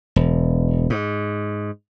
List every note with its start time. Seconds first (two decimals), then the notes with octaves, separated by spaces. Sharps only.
0.16 E1
0.90 G#2